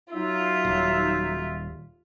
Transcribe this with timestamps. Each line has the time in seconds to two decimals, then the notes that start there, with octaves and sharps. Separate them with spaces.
0.13 F#3 D#4 F4 E5
0.65 D#1